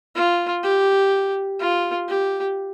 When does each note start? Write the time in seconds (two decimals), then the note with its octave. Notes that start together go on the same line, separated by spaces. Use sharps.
0.15 F4
0.63 G4
1.60 F4
2.08 G4